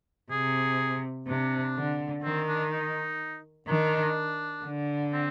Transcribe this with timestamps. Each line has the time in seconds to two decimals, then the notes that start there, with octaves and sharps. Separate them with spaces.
0.31 C3 G#4
1.27 C3 D4
1.76 D3
2.24 D#3 C4
2.48 D4
2.72 D#4
3.67 D#3 D4
4.65 D3
5.13 C4